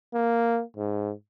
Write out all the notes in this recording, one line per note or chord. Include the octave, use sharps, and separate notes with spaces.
A#3
G#2